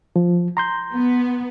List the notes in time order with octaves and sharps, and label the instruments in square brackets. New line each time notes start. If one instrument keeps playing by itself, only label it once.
[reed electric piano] F3
A#5 C6 G6
[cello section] B3